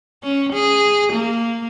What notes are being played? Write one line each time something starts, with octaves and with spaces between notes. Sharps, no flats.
C#4
G#4
A#3